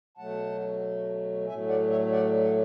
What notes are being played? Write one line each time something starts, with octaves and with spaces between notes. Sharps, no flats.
B2 F#3 A3 F#5 A5
A2 F#3 A3 E5 G#5
D5 F#5
C#5 E5
D5 F#5
F#5